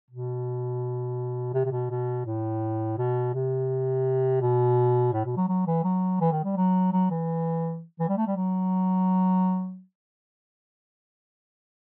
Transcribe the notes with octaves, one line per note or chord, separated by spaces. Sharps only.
B2
C3
C3
B2
B2
A2
B2
C3
B2
A2
B2
F#3
F#3
E3
F#3
E3
D#3
G3
F#3
F#3
E3
E3
G3
A3
G3
F#3